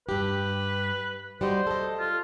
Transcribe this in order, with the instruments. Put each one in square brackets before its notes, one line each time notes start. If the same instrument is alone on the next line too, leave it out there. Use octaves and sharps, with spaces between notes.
[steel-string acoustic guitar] G2 G4 [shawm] B4
[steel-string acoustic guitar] G3 F#4 D#5 [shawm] C5
[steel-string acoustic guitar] A4 D#5
[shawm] F4